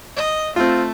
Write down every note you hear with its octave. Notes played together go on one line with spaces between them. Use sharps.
D#5
A3 C4 F4